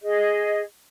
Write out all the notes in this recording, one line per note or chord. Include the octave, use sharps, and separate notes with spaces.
G#4 D#5